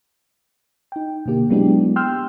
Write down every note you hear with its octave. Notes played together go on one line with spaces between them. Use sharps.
D#4 G5
B2 D3 A#3 G4
F#3 G#3 B3 D4 E4 G4
G5 C6 E6 F6 G6